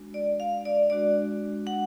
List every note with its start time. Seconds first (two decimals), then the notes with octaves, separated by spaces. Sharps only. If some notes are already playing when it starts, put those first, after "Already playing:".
Already playing: G#3 D4 F#4
0.14 D5
0.40 F5
0.65 D5
0.90 G#3 D4 F#4 D5
1.67 F#5